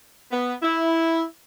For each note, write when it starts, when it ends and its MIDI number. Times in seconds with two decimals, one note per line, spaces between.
0.31 0.54 59
0.63 1.23 64